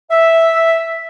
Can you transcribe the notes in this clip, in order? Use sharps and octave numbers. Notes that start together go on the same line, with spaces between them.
E5